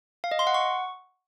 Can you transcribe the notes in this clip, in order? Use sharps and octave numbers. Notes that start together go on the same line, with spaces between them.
F5
D#5
C6
F#5
C#6